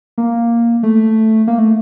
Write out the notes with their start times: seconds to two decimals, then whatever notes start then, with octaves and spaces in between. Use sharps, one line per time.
0.18 A#3
0.83 A3
1.47 A#3
1.59 A3